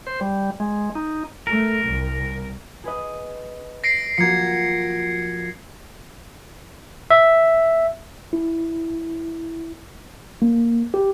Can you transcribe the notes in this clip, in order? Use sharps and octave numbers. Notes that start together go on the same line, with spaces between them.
C5
G3
G#3
D#4
A3 A#4
C2
G#4 B4 D#5
A#6 C7 D7
F3 A#3 F#4 G#6 C#7
E5
E4
A#3
G4